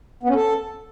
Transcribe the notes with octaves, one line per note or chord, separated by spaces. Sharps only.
B3
C#4
A4